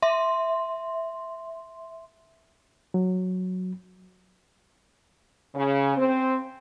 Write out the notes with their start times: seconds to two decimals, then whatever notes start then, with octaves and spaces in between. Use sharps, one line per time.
0.02 E5 C6
2.94 F#3
5.55 C#3
5.97 C4